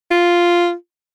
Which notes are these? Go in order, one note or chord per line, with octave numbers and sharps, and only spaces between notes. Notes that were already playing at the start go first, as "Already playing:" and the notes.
F4